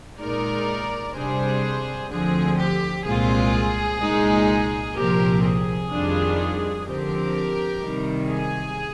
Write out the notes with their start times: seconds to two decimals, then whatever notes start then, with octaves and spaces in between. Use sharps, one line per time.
0.19 A#2 G#3 D#4 A#4 D5
1.14 C3 G3 D4 G#4 C5
2.10 D2 D3 F3 C4 G#4
2.57 G4
3.04 C2 A#2 G#3 C4 F4 G#4
4.00 C2 A#2 G#3 D#4
4.95 C2 A#2 F3 C4 G4 A#4
5.43 G#4
5.91 F2 D#3 G3 D4 F4
6.85 D3 F3 C4 G4 A#4
7.81 C3 D#3 G3
8.28 G#4